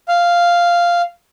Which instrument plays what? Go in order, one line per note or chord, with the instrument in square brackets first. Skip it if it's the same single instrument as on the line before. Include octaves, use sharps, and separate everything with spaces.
[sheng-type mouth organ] F5